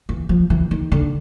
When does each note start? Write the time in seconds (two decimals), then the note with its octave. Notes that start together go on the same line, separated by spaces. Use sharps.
0.09 E3
0.29 F3
0.50 E3
0.71 D#3
0.92 D3